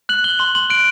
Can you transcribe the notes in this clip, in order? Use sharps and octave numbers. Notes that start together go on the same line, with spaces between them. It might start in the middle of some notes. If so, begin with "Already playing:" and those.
F#6 F#7
F#6 G7
C6 F#7
C6 F#7
F#6 D7